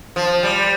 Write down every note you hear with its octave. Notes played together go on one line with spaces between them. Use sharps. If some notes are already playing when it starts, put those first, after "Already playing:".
F3
G3